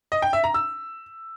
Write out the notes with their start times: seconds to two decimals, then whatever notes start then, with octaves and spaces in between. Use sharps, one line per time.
0.12 D#5
0.22 G5
0.33 E5
0.44 A#5
0.54 E6